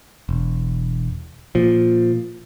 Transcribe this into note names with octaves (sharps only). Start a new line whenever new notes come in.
E1
A#2 F3